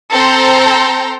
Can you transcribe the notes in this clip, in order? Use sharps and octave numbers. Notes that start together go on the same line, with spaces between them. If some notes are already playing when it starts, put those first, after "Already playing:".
C4 A4 C5 G5 A#5 C6